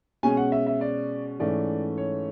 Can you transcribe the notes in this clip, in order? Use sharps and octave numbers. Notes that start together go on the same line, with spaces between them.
B2 G#3 C#4 G#5
F#5
E5
E5
D5
G#2 E3 A3 C#4 D5
C#5